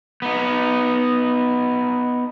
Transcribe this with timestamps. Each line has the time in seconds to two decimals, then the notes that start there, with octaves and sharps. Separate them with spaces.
0.22 B3 D#4